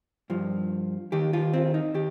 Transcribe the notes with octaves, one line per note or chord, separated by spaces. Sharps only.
G2 F3
D#2 D#3 G4
F4
C4
D#4
D#3 G4